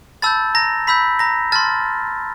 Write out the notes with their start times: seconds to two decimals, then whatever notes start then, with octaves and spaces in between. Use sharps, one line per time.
0.22 A5 B5 E6 G6 A6
0.55 A#5 A#6
0.87 B5 E6 G6 B6
1.19 A#5 A#6
1.52 A5 C6 F6 A6